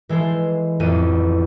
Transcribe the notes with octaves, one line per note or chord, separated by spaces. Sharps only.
E3 G#3 A4 C5
A1 F2 E3 D#7